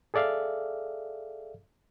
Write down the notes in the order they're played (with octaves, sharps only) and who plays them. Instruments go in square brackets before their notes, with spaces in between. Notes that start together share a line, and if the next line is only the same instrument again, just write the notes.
[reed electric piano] G#4 A4 D5 E5 F5